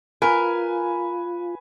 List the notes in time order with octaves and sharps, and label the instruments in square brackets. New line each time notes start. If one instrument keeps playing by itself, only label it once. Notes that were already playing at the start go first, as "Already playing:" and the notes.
[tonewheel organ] F4 [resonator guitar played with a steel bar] A#4 [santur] B4 [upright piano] G#5